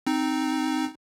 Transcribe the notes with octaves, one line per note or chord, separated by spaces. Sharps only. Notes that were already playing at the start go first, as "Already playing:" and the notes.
C4 D#4